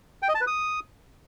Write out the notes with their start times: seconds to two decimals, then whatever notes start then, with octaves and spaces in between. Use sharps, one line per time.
0.22 G5
0.29 D#5
0.35 A5
0.41 B4
0.47 D#6